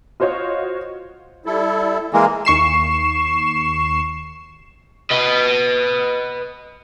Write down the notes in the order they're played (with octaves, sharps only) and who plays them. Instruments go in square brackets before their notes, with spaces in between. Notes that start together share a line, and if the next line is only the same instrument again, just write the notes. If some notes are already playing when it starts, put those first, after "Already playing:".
[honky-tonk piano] F4 F#4 C5 C#5 D#5
[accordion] G3 E4 A4
[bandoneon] E3 G#3 A#3 [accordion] A#4
[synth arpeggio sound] D#2 C#6 C7 E7
[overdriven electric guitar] B4 D#5